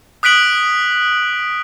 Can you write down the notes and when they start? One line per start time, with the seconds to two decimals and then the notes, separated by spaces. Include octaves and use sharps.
0.23 D#6 F#6 B6 D7 F#7